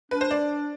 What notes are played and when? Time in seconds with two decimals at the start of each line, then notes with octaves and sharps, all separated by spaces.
0.11 D4 B4
0.21 C5
0.31 D5